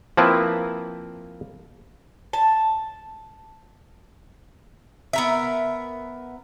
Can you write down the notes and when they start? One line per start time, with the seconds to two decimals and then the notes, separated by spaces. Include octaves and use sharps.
0.17 F3 A#3 C4 E4 B4
2.33 A5
5.13 B3 A#4 E5